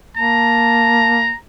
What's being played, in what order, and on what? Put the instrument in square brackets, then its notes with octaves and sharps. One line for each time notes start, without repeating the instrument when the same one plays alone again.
[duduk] A#3 [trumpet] A5 [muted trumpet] A#5